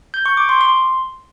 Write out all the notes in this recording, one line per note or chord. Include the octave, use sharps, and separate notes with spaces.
G6
C#6
D6
C6
C6